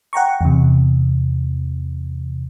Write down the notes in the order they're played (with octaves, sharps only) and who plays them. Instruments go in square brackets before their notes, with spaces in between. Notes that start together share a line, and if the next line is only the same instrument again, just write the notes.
[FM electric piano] F#5 G5 A#5 C#6
E2 C3